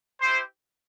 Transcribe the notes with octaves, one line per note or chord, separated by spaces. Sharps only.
E4 G4 C5